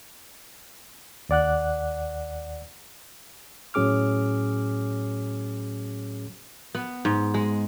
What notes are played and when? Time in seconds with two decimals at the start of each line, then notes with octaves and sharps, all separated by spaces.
1.29 D#2 D5 F#5 F#6
3.74 A2 F#3 C#4 G#4 D6 F6
6.75 B3
7.05 G#2
7.34 G#3